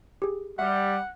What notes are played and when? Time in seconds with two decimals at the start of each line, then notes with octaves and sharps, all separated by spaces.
0.22 G4 G#4
0.59 G3 E5 F#5